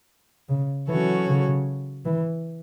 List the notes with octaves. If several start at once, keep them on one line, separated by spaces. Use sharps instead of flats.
C#3
E3 F#3 C#4 F#4 A4 C#5
C#3
E3